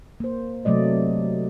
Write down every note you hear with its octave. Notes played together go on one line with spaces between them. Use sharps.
A#3 C5
C3 F#3 A3 D5 D#5